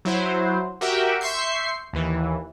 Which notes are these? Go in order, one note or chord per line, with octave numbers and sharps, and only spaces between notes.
F#3 E4 C5
F#4 G4 A#4 E5 G5
E5 C6 C#6 G6 C7
D#2 E3